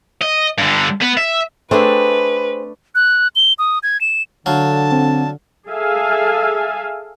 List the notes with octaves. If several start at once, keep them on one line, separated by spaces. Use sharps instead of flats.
D#5
G2 D3
B3
E5
A3 C4 D4 G#4 B4
F#6
G7
D#6
G#6
E7
D3 F#3 F5 A5
C4
G#4 A4 E5 F5 G#5